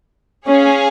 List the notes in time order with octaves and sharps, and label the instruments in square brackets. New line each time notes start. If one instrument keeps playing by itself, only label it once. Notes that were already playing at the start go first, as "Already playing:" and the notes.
[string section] C#4 [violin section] G#4 C#5 F5 G#5